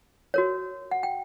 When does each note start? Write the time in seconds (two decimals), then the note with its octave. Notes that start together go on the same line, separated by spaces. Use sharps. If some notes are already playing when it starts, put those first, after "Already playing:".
0.34 F#4 A#4 C#5
0.91 F#5
1.03 G5